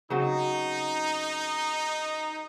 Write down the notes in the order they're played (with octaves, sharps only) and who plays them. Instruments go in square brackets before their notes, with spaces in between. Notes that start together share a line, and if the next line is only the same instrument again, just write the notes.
[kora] C#3 F#3 C4 [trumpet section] D#4